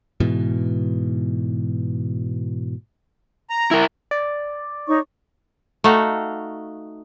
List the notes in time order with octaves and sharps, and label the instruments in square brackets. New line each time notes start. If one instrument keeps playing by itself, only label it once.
[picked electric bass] G#2 B2 E3
[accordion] A#5
[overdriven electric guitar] E4 A#4
[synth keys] D5
[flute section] D#4 C#5 C#6
[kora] A3 D#4 F#4 F5